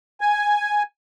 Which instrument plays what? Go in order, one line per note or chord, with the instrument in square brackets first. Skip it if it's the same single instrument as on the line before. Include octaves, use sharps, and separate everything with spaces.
[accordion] G#5